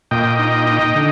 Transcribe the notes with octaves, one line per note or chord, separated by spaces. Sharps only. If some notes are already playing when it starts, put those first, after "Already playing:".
A#2 D#5 G5
D#4
D#4
D3